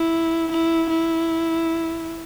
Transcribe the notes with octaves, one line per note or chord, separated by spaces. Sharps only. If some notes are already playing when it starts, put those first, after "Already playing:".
Already playing: E4
E4
E4